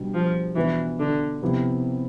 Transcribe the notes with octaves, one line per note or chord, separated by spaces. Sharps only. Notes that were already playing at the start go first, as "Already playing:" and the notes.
Already playing: B2 G3 D4 G4
F3
B2 E3 B3 D4 F4
D3
C3 F3 B3 E4 G4